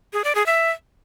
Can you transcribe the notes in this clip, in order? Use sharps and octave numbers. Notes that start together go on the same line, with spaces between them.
G#4
D5
G#4
E5